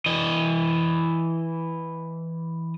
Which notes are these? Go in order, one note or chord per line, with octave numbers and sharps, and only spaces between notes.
E3 D#5